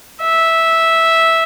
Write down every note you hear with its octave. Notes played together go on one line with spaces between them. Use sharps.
E5